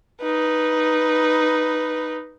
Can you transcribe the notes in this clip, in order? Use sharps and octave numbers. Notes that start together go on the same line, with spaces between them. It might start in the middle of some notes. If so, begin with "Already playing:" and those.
D#4 B4